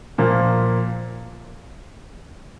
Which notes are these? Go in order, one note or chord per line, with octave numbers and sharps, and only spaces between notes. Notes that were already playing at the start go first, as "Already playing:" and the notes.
A#2 F3 A#3